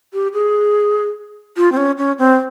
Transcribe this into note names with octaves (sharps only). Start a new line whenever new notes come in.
G4
G#4
F4
C4
C#4
C#4
C4